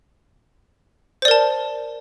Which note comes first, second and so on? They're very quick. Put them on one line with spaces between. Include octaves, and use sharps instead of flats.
C5 D5 A#4 A5